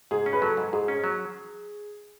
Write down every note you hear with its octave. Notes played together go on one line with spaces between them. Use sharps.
G#2 G#4
C#4
B4
F#3 A4
G#2
G#2 G#4
C#4
F#3